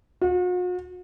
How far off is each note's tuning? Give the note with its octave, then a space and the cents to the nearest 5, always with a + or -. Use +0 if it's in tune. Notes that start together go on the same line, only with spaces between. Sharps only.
F#4 -45